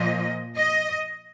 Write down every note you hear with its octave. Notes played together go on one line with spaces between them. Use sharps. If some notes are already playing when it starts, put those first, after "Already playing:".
Already playing: A#2 F3 D#5
D#5